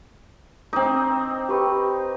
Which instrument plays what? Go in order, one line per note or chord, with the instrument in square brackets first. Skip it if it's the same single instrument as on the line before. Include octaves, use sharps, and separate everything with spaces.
[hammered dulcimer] C4 D#4 [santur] D6
[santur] G4 B4 C#6